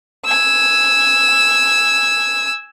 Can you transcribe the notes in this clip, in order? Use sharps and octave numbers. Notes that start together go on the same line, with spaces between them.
G#5 E6